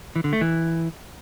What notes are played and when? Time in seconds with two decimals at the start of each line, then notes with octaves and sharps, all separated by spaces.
0.16 E3
0.24 D3
0.33 A3
0.41 E3